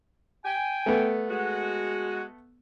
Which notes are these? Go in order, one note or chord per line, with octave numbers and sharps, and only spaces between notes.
G5 G#5
A3 B3
G#3 F#4